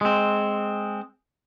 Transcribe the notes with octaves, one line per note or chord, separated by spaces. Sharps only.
G#3 C4